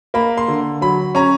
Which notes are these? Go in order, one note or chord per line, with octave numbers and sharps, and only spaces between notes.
A#3 B5
C6
D3
F#3 B5
C#4 A#5